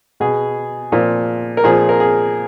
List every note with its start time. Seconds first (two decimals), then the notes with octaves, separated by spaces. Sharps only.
0.20 B2 G#4
0.92 A#2 F3
1.57 A#4
1.64 A#2 F3 G#4
1.89 A#4
2.00 G#4